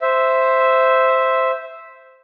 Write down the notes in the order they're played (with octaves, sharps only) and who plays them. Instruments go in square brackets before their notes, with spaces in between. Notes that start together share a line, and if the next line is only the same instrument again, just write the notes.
[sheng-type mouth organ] C5 E5